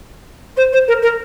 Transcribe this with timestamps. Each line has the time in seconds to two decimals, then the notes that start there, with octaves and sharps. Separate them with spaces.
0.56 C5
0.72 C5
0.88 A#4
1.02 A#4